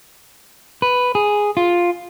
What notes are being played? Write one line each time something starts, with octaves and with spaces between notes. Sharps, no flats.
B4
G#4
F4